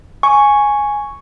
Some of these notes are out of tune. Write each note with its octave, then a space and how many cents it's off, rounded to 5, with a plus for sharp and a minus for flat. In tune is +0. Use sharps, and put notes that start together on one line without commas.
G#5 +0 C#6 +0